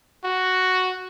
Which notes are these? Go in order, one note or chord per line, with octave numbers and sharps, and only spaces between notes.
F#4